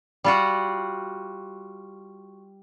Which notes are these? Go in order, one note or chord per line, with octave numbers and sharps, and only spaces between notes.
G3 F4 F#4